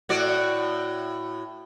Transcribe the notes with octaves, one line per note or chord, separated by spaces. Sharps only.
A2 F#4 D5